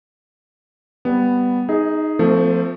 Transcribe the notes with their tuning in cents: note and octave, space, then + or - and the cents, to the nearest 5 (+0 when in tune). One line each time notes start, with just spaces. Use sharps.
G3 +0 B3 +0
D#4 +0 G#4 +0 D#5 +45
F3 +0 A3 +20 C4 -35